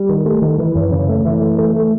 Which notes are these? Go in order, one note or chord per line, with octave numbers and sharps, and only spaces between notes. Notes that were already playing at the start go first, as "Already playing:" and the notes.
Already playing: G3
D#3
A3
D#3
E3
F#2
C#3
A3
E3
A3
A3
A3